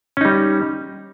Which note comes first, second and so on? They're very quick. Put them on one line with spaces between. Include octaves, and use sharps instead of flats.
C#4 D#4 G3